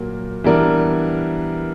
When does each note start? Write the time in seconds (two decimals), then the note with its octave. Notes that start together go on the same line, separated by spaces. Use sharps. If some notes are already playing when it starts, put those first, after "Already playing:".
Already playing: A#2 F#3 A#3
0.44 E3 G3 B3 D4 A#4